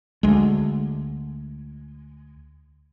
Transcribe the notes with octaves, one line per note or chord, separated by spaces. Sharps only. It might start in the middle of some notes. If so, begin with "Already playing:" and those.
D2 G#3